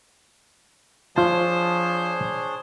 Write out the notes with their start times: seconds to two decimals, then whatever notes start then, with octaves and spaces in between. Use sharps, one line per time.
1.16 F3 D4 F4 G#4 C5 C#5 A5